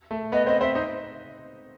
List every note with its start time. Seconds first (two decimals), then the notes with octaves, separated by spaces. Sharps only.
0.11 A3 A4
0.32 B3 B4 D#5
0.46 C4 C5 D#5
0.61 C4 C5 E5
0.75 D#4 C5 D#5